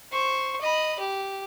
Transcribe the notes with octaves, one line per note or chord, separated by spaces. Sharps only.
C5 C#6
D#5 B5
G4